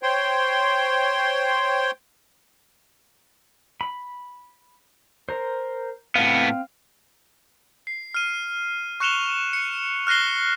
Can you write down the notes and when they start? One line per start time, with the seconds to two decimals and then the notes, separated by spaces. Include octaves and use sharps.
0.03 C5 C#5 G5 C6
3.81 B5
5.29 A#4 C5
6.16 A2 B3 C4 F5
7.87 C7
8.14 F6 D#7
9.00 C#6 F#6 C#7 E7 F7 G7
9.53 C#7
10.07 F6 F#6 A#6 C7 G7